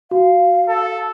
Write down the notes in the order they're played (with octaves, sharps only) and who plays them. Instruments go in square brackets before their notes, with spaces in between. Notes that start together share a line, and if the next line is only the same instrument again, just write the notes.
[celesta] F#4 [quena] F5
[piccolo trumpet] A4